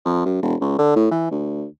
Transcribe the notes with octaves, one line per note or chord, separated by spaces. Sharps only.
F2
F#2
E1
C#2
D3
A2
E3
D2